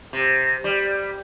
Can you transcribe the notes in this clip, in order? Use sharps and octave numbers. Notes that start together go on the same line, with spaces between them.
C3
G3